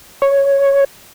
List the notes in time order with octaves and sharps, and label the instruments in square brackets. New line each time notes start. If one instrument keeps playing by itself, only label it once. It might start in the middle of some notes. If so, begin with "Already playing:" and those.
[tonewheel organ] C#5